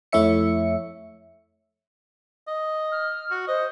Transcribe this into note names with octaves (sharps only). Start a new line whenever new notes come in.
F2 A3 E4 C#5 E5 C#7
D#5
F6
F#4
C5 D#5